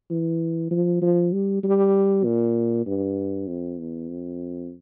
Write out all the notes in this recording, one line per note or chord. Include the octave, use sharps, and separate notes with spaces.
E3
F3
F3
G3
G3
A#2
G2
F2
E2
F2